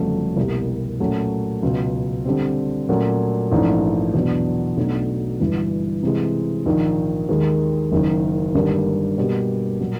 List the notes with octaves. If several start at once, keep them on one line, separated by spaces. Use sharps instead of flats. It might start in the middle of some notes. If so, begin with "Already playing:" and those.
Already playing: G1 F2 C#3 F#3 A3
C2 B2 G3 A#3
A#2 F#3 A3 C#4
C#2 B2 F#3
D3 G3 C4
A#2 F#3 A3 C#4
A#1 G#2 E3 A3 C#4
E2 B2 F#3 B3 D4
B1 B2 F#3 A3 D4
G1 G2 E3
C3 E3 G#3
A#1 G#2 D#3
D#2 D#3 G#3
F#1 F#2 D#3
G#1 G2 D3 G3 A#3
B2 G3 A#3
A#2 F#3 A#3